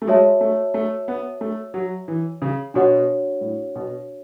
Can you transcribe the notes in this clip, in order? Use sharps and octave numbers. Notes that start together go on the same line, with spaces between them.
A3
G#3 F#4 C#5 E5 A5
A3
A3
B3
A3
F#3
E3
C#3
B2 D4 F#4 C#5 F#5
A2
B2